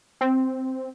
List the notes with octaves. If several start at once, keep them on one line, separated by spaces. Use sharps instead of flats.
C4